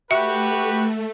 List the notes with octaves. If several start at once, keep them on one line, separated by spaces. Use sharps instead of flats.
A3 F#4 G4 B4 E5